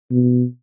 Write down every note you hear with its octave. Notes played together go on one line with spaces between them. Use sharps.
B2